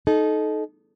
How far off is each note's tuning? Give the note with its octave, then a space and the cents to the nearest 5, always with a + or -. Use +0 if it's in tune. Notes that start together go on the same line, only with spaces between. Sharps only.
D#4 +0 A4 -25